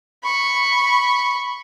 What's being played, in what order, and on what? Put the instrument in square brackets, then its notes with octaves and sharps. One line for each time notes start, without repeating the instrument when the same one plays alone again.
[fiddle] B5 C#6